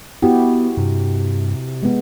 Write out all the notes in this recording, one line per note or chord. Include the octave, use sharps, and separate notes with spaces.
B3 E4 F#4 G4
G2 C3
G#3 B3